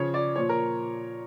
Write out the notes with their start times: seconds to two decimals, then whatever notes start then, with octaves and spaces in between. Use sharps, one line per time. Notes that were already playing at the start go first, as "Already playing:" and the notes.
Already playing: C#3 F3 C#5
0.14 D5
0.36 A#2 F3 C#5
0.49 A#4